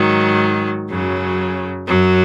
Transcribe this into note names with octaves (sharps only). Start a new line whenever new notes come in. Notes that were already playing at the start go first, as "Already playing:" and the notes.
Already playing: G#2 D#3 F#3
F#2 C#3 F#3
F#2 F#3